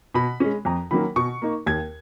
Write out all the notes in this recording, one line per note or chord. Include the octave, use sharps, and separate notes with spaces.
B2 B5
G#3 C#4
F2 A#5
D#3 F#3 A#3 C#4 B5
B2 C#6
A#3 D#4
D#2 G#6